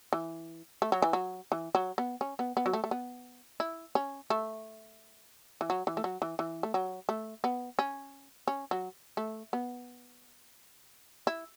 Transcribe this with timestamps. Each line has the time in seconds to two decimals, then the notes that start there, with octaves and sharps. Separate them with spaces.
0.13 E3
0.82 A3
0.92 F#3
1.02 E3
1.13 F#3
1.52 E3
1.75 F#3
1.98 B3
2.21 C#4
2.39 B3
2.57 B3
2.66 F#3
2.73 A3
2.84 A3
2.91 B3
3.60 E4
3.95 C#4
4.30 A3
5.61 E3
5.70 F#3
5.87 E3
5.97 A3
6.04 F#3
6.22 E3
6.39 E3
6.63 A3
6.74 F#3
7.09 A3
7.44 B3
7.79 C#4
8.48 C#4
8.71 F#3
9.17 A3
9.53 B3
11.27 E4